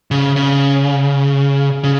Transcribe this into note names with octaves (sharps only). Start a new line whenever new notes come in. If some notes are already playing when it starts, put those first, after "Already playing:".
C#3
C#3
C#3